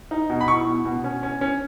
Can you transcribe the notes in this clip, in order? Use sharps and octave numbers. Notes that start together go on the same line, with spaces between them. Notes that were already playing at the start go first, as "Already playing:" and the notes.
D#4
B2
B5
E4 C#6
B2
B2
C#4
C#4
C#4